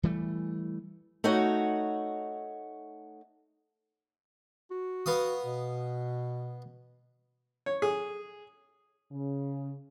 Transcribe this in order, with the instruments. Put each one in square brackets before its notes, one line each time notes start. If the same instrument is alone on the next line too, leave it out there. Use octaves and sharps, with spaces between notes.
[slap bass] E3 G3 A3
[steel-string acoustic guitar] A3 D#4 F#4 C#5 F#5
[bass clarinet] F#4
[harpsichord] B3 F5 D#6
[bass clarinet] B2
[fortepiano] C#5
G#4
[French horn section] C#3